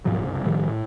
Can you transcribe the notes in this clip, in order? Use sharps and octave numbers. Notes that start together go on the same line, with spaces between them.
G#2 B2 F3 F#3
F#1 C2 G2
A2 D#3 F3 G3
A2